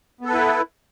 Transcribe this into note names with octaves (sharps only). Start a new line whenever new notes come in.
B3 E4 A4 B4